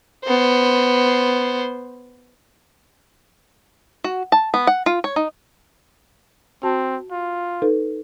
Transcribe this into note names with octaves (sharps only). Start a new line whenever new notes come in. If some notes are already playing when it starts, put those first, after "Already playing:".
B3 C5
F#4
A5
B3
F#5
F4
C#5
D#4
C4 F#4 A5
F4
D#4 A4 B4